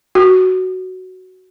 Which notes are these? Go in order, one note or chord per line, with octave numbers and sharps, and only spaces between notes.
F#4